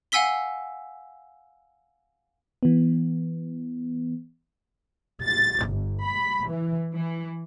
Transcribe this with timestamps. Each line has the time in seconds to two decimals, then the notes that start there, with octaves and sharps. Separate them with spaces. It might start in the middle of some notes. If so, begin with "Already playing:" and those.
0.12 F5 F#5 G#5 E6 B6 G7
2.63 E3 B3
5.24 A6
5.66 G1
6.05 B5
6.48 E3
6.93 E3